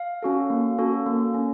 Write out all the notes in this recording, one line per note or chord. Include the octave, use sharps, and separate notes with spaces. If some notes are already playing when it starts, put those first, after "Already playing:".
Already playing: F5
C#4 F#4 A4
A#3
C#4 F#4 A4
A#3
C#4